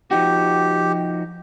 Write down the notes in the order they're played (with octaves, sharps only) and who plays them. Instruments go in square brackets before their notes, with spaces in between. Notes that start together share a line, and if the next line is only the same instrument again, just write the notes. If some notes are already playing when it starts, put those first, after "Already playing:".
[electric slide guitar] F3 D#4 F#4 [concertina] G4